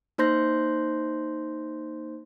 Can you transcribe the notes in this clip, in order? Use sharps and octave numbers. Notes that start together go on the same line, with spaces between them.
A#3 D#4 C5 C6 G6 A#6